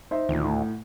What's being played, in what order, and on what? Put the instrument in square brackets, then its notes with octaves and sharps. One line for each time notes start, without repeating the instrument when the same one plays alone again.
[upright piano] D#4 C5 E5
[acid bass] D2 [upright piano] A#2 D#3
[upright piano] A2